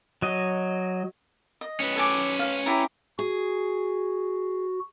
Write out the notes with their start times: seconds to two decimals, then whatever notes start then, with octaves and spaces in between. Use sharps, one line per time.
0.22 F#3 D#5
1.61 D#5
1.80 C#4 B4
1.96 A4 G#5 D6
2.39 F5
2.66 E4 G4 A#5
3.19 F#4 G#4